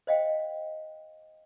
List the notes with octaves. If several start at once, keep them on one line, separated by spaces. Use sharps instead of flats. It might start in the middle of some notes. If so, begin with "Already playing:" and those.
C5 D#5 F5 G5